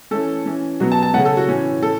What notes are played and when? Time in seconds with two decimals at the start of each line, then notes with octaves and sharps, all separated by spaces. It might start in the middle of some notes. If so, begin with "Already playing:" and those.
0.11 E3 A3 C#4 A4
0.46 E3 C#4
0.80 B2 F#3 B3 F#4
0.92 A5
1.03 A5
1.14 C#3 A3 C#4 F#5
1.25 A4
1.37 F#4
1.48 A2 E3 C#4
1.83 A2 A4